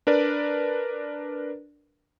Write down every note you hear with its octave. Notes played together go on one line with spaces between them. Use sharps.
D4 A#4 B4 D5